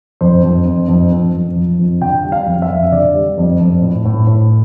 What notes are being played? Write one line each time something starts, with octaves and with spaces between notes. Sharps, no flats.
F2 C5
F2
F2
F2
F2
F2
F3
F2
D3 G5
G3
F5
F2
E5
F2
D3 D5
G3
F2
F2
A2
A2
A2